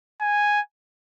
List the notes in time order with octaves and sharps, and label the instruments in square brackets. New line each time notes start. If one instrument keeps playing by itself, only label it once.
[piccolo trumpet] G#5